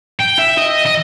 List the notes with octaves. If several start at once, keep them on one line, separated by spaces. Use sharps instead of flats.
G5
E5
D#5
D#5